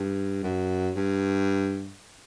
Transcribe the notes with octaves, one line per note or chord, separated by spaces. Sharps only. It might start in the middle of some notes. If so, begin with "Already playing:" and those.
Already playing: G2
F#2
G2